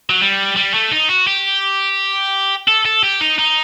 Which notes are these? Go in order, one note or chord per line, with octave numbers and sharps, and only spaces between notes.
F#3
G3
G3
A3
D#4
F#4
G4
A4
A4
G4
D#4
D#4